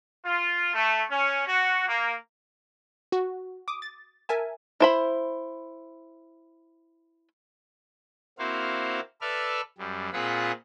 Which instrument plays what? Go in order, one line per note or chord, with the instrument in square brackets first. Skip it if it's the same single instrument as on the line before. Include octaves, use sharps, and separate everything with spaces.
[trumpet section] F4
A3
C#4
F#4
A#3
[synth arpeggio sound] F#4
D6 D#6
A6
A#4 E5 G#5 A5
[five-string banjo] E4 C5 B5
[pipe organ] A#3 C4 E4 F#4 C5 F5
A4 B4 D5 E5 F6
F#2 G3
A#2 C4 F4 G#4 F#5 B5